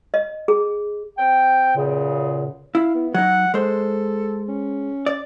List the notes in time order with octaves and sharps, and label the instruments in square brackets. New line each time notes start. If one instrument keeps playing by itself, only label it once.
[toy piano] D#5
G#4
[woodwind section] C4 G5
C#2 F#2 A#2 C#3
[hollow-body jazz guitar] E4 [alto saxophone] F5
[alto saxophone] B3
[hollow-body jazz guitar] F#3 D#4 [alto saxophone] F#5
[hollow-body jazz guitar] G#3 C5 [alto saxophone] A4
[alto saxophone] C#4
[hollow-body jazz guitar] D5